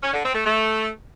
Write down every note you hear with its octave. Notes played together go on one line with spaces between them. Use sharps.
C#4
D3
C4
A3
A3